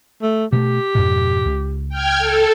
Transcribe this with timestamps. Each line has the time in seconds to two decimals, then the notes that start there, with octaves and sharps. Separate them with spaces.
0.22 A3
0.52 B2 G#3 A3 G4
0.95 F2 G#2 B2
1.45 C#2
1.89 G5 F6 G#6
2.18 A4